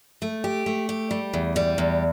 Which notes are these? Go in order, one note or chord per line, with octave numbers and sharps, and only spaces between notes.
A3
G4
A3
G4
G3
E2
G3
E2